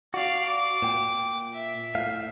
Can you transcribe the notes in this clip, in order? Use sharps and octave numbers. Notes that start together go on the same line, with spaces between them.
F#4 D5 F5
D6
A#2 G5
E5
A2 F5